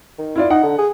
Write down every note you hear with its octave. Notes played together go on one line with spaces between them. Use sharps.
D#3
E4 F4 D5
D#4 F#5
D3
G#4